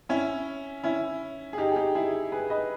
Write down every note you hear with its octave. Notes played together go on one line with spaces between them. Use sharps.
C#4 E4
C#4 E4
G#4
D#4 G4
G#4
D#4 G4
E4 G#4
G#4 B4
B4 D#5